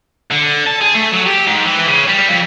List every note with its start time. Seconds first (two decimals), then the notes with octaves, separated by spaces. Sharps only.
0.31 D3
0.66 A5
0.81 G#4
0.94 A3
1.13 F#3
1.26 G4
1.47 G#2
1.64 E3
1.87 C#3
2.08 G3
2.28 F2